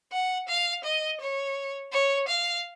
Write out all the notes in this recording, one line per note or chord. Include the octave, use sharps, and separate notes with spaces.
F#5
F5
D#5
C#5
C#5
F5